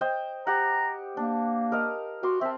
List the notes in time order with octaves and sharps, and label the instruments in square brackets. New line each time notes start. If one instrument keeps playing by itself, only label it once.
[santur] C5 D#5 G5
[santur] G4 F#5 [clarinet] A#5
[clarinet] A#3 [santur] D4
[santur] A#4 D#5 F5
[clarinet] F#4 [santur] C6 D6
[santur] C4 A5 [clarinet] E5